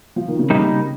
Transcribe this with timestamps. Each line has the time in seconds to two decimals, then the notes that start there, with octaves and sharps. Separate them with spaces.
0.16 F3
0.28 D#3
0.39 C#3
0.50 C3 G3 A#3 D#4
0.68 C#3